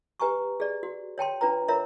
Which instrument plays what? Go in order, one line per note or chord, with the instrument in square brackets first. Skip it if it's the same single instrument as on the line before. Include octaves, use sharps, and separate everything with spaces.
[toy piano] G4 B4 G#5 A#5 C#6
G#4 D5
F#4
C#5 G5 A5 C6
D4 F4 B4 A#5
F4 A#4 C#5 E5 A#5